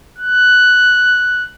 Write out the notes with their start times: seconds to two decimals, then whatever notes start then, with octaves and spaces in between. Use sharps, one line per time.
0.18 F#6